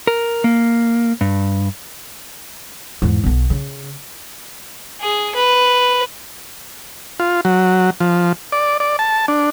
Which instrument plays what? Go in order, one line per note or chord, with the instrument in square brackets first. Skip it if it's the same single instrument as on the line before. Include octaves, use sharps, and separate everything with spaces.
[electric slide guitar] A#4
A#3
G2
[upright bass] E2 G#2
B1 B3
C#3
[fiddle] G#4
B4
[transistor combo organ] F4
F#3
F3
D5
D5
A5
D4